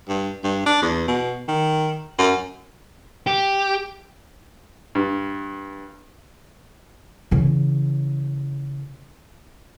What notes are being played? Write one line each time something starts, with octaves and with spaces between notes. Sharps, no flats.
G2
G2
D4
E2
B2
D#3
F#2
G4
G2
C#3 E3